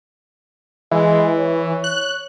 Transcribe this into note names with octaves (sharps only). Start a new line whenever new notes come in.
E3 G#3
C#5
F#6